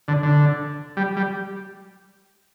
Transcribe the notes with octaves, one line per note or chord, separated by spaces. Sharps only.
D3
D3
G3
G3